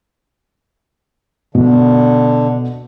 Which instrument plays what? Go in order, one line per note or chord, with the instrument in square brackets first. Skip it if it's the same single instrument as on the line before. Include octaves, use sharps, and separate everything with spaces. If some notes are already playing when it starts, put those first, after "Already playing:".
[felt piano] B2 [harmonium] D3